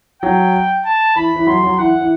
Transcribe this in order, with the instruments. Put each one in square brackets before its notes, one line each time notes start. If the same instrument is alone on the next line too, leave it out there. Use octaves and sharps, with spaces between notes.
[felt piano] F#3 [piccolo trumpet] G5
[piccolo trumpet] A5
[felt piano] E3 [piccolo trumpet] B5
[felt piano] E3
[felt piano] F#3 [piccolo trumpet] C6
[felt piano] F#3
[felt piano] E3 [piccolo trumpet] F#5
[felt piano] E3